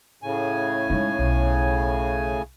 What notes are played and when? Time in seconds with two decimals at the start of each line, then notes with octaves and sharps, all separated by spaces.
0.23 A2 C#3 G#5
0.90 G#3 D#4
1.19 B1